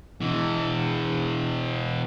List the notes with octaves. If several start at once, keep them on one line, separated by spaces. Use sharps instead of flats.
B2 E3